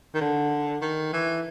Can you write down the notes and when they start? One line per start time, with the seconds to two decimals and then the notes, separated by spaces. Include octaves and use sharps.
0.14 D#3
0.21 D3
0.82 D#3
1.13 E3